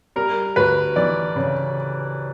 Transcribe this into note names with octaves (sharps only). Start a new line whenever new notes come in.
G3 A#4
D2 B4
E3 D5
C#3